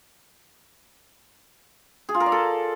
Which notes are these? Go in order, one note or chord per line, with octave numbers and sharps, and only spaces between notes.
G#4
F4
A#4
D5
A4